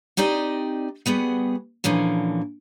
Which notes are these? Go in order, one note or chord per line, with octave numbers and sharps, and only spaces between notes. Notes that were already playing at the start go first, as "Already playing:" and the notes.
C4 D#4 G4 D5 D#5
G3 B3 F#4 G#4
A#2 D3 E3 F3 C#4